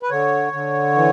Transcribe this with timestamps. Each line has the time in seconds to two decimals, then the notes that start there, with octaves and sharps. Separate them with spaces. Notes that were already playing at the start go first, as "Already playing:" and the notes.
0.03 B4
0.10 D3 C#5
0.53 D3
0.95 E3